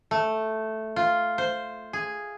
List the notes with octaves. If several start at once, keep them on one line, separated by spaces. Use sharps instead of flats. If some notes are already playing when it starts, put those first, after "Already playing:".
A3
F4
C5
G#4